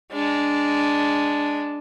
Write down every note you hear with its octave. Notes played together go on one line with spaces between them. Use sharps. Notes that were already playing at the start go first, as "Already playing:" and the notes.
G#3 D4